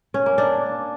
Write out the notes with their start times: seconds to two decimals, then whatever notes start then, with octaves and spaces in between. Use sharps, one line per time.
0.14 C#4
0.26 A#3
0.38 D4